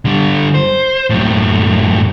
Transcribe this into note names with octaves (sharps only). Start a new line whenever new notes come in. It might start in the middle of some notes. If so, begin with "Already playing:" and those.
D3 G3
C5
F#2 A2